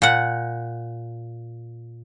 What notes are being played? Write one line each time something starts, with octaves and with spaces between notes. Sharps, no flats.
A#2 F#5